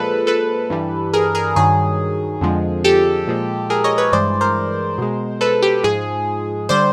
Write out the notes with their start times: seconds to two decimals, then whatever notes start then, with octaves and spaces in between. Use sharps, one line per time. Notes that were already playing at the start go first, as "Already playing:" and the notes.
Already playing: A#2 F3 G#3 A4 B4
0.27 A4 B4
0.70 G2 E3 G3
1.13 G#4 A#4
1.35 G#4 A#4
1.56 G2 D#3 F#3 G#4
2.41 F2 D3 F3 G#3
2.84 G4 A4
3.27 A#2 F3 G#3
3.70 G#4 A#4
3.84 C#5 D#5
3.98 B4 C#5
4.12 G2 E3 G#3 C5 D5
4.41 A#4 C5
4.98 B2 G#3
5.41 A4 B4
5.62 G4
5.84 G#2 F3 G#3 G#4
6.69 D3 G3 C5 D5